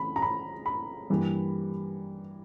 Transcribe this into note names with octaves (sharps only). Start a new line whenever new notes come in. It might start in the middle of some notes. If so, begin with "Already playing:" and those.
Already playing: C#3 E3 A3 B5
A#5
B5
B5
G2 E3 G3 A#3